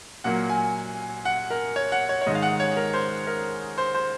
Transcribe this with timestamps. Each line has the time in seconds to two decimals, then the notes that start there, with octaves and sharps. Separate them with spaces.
0.24 A#2 F#3 A#3 F#5
0.50 G#5
1.25 F#5
1.50 A#4
1.76 C#5
1.92 F#5
2.09 C#5
2.22 C#5
2.27 G#2 D#3 G#3 D#5
2.35 F5
2.42 F#5
2.60 C#5
2.77 A#4
2.94 C5
3.27 A#4
3.78 C5
3.94 C5